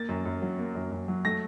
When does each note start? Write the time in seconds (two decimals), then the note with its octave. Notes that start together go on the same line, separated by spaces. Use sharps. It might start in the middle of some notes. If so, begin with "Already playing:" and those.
Already playing: A#3 A6
0.09 F#2
0.26 F#2
0.42 F#3
0.59 A#3
0.75 F#2
0.92 F#2
1.08 F#3
1.25 A3 A#6